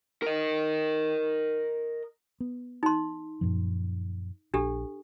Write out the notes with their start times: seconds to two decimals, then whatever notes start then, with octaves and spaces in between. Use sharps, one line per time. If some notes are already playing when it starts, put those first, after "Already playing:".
0.22 A#4 D#5
2.40 B3
2.83 D#4 C6
3.41 F#2 A#2 F3
4.54 A#1 D4 G4 A4